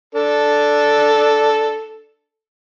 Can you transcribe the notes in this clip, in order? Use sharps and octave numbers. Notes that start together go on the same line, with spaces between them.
D4 A4